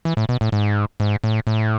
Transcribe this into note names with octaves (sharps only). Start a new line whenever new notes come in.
E3
A2
B2
A2
G#2
G#2
A2
A2